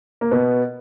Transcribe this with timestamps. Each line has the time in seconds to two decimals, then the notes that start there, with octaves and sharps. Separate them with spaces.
0.21 A#3
0.31 B2 B3